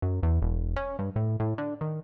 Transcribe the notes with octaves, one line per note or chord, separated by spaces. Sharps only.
F#2
E2
E1
C#4
G2
A2
A2
D3
D#3